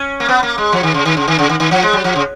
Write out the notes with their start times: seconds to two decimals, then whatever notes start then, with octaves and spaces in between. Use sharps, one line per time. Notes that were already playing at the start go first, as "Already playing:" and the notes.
Already playing: C#4
0.20 A#3
0.29 B3
0.43 A#3
0.58 G#3
0.72 F3
0.83 D#3
0.94 C#3
1.05 D#3
1.17 C#3
1.28 D#3
1.39 C#3
1.49 D#3
1.60 D#3
1.71 F3
1.83 G#3
1.93 F#3
2.04 F3
2.16 C#3